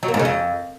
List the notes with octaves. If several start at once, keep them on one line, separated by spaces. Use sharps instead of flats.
F#3
A#3
G#2
C#3
F2